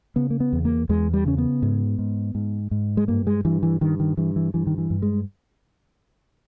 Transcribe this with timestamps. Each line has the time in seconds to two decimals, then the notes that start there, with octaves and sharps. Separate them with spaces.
0.16 C#3 B3
0.30 A#3
0.40 B3
0.53 E2
0.65 A#3
0.89 E2 G#3
1.14 G3
1.25 C#3 C#4
1.38 B3
1.62 G#2
1.99 G#2
2.35 G#2
2.71 G#2
2.97 G#3
3.08 G2 A#3
3.27 G#3
3.45 G2 E3
3.63 E3
3.81 G2 D#3
4.00 D#3
4.17 G2 E3
4.36 E3
4.54 G2 E3
4.67 D#3
4.78 E3
4.90 G2
5.02 G#3